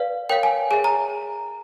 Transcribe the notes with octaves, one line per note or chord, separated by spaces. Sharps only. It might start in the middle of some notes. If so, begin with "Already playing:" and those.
Already playing: B4 D5 F5
A#4 C#5 F5 G5
G#5
G#4 C#5 E5 G#5
A#5